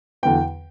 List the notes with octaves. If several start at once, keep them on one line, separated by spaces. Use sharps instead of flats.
E2 D3 F#3 B3 G5